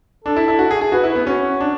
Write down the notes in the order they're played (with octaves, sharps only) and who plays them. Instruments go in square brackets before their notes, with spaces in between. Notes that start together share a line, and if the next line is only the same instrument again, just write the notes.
[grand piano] D4 [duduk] A4
[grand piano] E4
E4
F#4
G#4
G#4
[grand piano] F#4 [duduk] B4
[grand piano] E4
[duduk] B4
[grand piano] B3
[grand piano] C#4 [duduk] F#4
[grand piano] D4